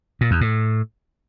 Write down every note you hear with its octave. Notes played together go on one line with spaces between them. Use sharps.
A#2
E2
A2